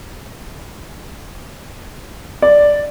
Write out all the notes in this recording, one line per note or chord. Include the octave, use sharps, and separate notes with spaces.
D5